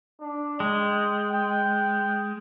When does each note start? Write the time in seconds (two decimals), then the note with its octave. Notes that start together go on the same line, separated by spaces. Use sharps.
0.21 D4
0.60 G#3 G5
1.32 G5